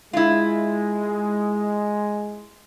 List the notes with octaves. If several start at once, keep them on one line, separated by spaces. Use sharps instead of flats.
G#3 E4 F4